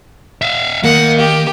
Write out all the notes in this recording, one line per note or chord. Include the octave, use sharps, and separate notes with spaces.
E5 F5
D#3 A#3 F#5
G4